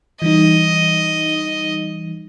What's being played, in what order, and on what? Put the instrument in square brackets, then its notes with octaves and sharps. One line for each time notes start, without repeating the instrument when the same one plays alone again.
[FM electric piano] E3 G3 D#4 [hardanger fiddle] D#5